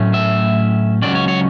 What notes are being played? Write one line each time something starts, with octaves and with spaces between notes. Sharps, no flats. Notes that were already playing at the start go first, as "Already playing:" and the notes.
Already playing: A2 F#3 A3 C#4
E5
C#2 C#3 F#3 C#4 D5
C#5
C#5